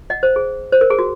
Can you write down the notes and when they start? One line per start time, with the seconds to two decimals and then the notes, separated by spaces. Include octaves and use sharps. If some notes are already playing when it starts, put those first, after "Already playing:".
0.10 D#5 F#5
0.23 C5
0.36 G#4
0.72 C5
0.81 A#4
0.90 G#4
0.99 F#4